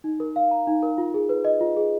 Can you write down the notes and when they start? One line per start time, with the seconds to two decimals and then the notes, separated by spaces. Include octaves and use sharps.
0.04 D#4
0.20 A#4
0.36 F5
0.51 A#5
0.67 D#4
0.83 A#4
0.98 F4
1.14 G#4
1.29 B4
1.45 D#5
1.61 F4
1.77 G#4